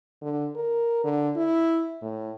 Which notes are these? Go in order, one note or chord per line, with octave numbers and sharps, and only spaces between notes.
D3
A#4
D3
E4
A2